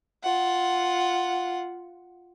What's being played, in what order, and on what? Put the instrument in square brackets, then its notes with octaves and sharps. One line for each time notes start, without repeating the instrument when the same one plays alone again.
[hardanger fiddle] F4 F#5